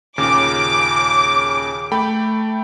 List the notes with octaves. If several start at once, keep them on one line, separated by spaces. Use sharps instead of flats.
D#2 A#2 C#3 D6
A3 G5 B5